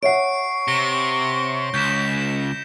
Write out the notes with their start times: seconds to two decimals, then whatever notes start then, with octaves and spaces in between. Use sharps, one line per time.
0.03 C#5 E5 F#5 C#6 C7 D7
0.68 C3 A#6 C#7 G7
1.74 C#2 G6 B6 E7